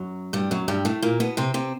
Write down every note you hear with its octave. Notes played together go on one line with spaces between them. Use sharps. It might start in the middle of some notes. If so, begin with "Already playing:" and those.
Already playing: F#2 F#3
G2 G3
F#2 F#3
G2 G3
A2 A3
A#2 A#3
B2 B3
C3 C4
C3 C4